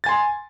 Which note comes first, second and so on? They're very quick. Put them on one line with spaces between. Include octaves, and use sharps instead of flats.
A6 G#5 C6